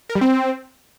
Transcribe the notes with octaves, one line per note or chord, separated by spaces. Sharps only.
A#4
G3
C4